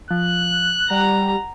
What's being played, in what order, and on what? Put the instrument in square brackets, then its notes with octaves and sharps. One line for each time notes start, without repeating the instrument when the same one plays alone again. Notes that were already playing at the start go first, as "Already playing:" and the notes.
[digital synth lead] F3 [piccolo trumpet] F#6
[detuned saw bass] G3 [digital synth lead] F#5 [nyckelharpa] A#5